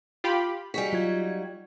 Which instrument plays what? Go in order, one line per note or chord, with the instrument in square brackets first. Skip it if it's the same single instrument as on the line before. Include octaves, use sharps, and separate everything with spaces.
[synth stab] F4 G4 B5
[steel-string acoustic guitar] G3 D#4 F#4 [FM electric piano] G#4 G#5 [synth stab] B6
[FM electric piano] F#3 F4 G#6